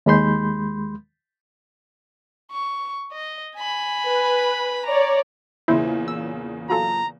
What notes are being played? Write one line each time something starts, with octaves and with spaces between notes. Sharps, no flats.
D#2 G#3 B5 C6 G6
C#6
D#5
G#5 B5
B4
C#5 D5 A#5
E2 A#2 C#3 E4 C5
E6
F#3 F4 A4 A#5